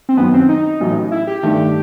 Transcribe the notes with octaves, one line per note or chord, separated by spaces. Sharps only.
C4
F#2 D#3 F#3 B3
C4
D#4
A1 A2 F#3
E4
G4
G2 D#3 A3